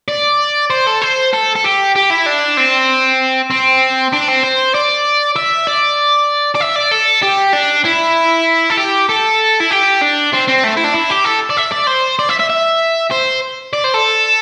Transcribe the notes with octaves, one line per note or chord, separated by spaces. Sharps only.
D5
C5
A4
C5
A4
A4
G4
G4
E4
D4
C4
C4
D4
C4
C5
D5
E5
D5
D5
E5
D5
A4
G4
D4
E4
A4
G4
A4
E4
G4
D4
C4
C4
A3
E4
D4
E4
G4
A4
D5
E5
D5
C5
D5
E5
E5
E5
C5
D5
C5
A4